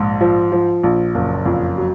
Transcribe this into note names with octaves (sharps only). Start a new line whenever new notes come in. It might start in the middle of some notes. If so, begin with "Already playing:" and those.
Already playing: A#1 G#2
F3
F3
A#1
F#1
F2
F#3